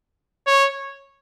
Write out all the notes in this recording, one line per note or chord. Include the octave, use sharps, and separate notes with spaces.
C#5